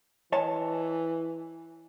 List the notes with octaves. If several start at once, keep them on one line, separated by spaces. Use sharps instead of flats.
E3 C#5 D#5 A5